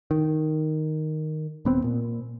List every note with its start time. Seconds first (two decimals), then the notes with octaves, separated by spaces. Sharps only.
0.11 D#3
1.65 D#1 B3 C4
1.84 A#2